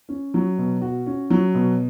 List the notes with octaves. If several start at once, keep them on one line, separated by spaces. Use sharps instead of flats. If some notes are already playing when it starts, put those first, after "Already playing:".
C#4
F#3
B2
F#4
C#4
F#3
B2